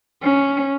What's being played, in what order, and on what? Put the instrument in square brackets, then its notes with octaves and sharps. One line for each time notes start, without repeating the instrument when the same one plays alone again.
[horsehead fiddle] C#4